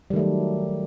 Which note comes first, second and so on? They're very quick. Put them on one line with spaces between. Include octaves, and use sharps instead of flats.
G3 D#3 A3 F#3